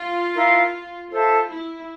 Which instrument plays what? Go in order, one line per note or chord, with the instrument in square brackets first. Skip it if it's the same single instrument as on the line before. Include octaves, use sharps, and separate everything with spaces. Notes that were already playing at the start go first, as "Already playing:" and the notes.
Already playing: [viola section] F4
[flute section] E4 A#4 F5
[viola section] F4 [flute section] A4 C5 E5 A5
[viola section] E4